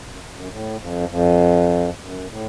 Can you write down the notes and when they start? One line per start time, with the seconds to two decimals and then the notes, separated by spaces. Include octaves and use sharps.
0.10 F#2
0.35 F#2
0.50 A2
0.79 F2
1.09 F2
2.00 F#2
2.29 A2